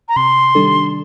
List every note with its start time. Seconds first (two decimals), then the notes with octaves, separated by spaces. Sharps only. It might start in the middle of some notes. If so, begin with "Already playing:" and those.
0.09 A#5
0.16 C3 C6
0.55 D#3 G3 D4 A4